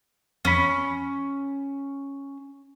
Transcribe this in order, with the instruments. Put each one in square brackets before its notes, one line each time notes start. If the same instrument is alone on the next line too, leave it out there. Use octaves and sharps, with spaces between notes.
[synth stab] F2 B5 [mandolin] C#4